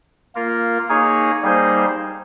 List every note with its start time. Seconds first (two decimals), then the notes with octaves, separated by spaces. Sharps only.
0.35 A#3 F4 A#4
0.88 A#3 D#4 G#4 C#5
1.42 G3 A#3 D#4 G#4 C5